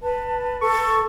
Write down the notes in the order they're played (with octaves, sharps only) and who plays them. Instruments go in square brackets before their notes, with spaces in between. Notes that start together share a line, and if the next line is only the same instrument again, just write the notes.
[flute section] B4 [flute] A5
[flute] A4 [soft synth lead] C#6